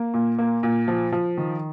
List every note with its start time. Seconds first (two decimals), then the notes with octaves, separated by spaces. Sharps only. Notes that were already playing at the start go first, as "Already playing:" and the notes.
Already playing: A#3
0.14 A#2
0.39 A#3
0.63 A#2
0.88 F3
1.12 F3
1.37 D#3